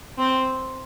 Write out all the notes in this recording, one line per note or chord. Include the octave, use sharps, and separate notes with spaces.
C4